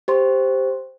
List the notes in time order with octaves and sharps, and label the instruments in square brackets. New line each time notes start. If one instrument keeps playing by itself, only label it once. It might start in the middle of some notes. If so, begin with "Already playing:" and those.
[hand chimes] G4 C5 C6